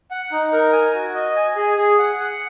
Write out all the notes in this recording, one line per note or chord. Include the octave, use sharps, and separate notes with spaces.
F#5
D#4
A#4
G#5
F#4
D#5
G#5
G#4
G#4
F#5
F#5